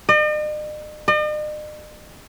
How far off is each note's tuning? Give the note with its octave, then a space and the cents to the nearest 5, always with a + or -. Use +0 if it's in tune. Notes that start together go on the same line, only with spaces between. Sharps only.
D#5 -45
D#5 -45